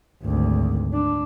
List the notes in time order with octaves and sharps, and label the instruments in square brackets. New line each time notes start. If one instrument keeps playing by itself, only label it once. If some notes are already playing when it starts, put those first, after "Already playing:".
[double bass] G#1 D2
D4